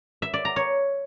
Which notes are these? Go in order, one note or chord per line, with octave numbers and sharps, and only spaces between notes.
E5
D5
A#5
C#5